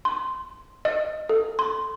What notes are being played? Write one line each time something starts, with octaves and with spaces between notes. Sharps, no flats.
C6
D#5
A4
C6